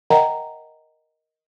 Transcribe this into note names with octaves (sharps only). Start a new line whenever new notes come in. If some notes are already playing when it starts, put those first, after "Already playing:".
A#4 D5 D#5 F#5 G5 A#5